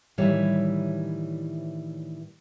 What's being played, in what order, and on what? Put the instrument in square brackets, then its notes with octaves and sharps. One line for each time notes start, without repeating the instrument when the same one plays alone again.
[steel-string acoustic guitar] A2 D#3 E3 G3 C#5 E5